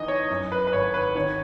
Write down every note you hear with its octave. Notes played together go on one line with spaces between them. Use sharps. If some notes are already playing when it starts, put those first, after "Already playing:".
Already playing: E2 E3 D#4 D#5
C#5
F#2
B4
B4
G#1 C#5
B4
D#3 C#5